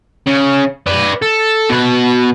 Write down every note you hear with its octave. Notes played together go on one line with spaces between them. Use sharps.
C#3
B4 D5
A4
B2 B4